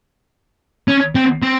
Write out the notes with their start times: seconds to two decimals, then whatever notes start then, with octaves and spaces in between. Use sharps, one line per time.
0.88 C#4
1.15 C4
1.42 C4